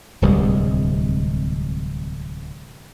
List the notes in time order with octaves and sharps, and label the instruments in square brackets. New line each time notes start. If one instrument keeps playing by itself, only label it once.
[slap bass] D1 C2 G3 G#3